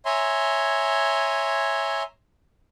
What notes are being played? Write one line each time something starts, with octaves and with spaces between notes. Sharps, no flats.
C#5 E5 G#5 A#5 C6